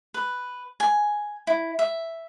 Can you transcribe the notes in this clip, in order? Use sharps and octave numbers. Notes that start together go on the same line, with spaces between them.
B4
G#5
E4
E5